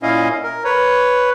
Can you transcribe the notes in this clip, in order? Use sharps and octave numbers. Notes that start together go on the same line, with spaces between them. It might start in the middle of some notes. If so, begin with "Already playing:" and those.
A#2 C#4 E4 D#5 F5
A#4
B4 C#5